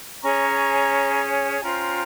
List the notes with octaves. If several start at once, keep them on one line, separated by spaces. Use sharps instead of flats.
C#4 G#4 C#5 A#5 C#6
G#5
C#4 F4 C5 G5 A#5